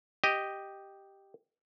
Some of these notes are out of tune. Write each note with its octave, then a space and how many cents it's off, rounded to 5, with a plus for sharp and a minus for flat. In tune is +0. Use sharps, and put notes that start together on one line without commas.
G4 +0 D#5 +0